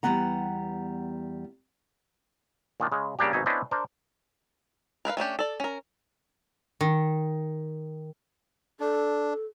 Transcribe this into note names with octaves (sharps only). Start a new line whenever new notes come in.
E2 G3 A#3 B3 F#5 A#5
A#2 D#3 D4
C#3 G#3
C#3 G3 A#3 D4 G4
G#1 B2 D#4 E5 G#5
B3 C#4 D4 E4 C5 D#5
D4 A#4 C5
A#4 B4 E5 F5
A3 C#4 D4 G4
A4 D5
C#4 A#4
D#3
D4 A4